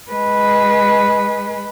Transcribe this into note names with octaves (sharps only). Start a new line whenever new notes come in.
G#3 B4